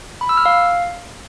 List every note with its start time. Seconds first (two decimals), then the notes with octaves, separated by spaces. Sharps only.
0.21 B5
0.29 E6
0.37 F6
0.46 F5